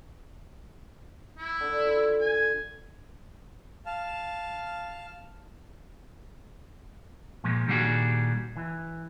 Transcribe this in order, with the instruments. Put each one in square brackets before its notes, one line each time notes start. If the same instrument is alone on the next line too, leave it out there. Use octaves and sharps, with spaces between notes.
[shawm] E4
[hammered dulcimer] D3
F4
[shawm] G#5
[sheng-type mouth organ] F5 A5
[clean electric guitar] A#2 F3 G#3
A#2 D#3 G3 D4 F#4 G#4
E3